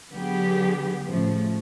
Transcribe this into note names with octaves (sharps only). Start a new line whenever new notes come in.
D3 F#3 B3 G4 G#4
A2 C#3 F3 A3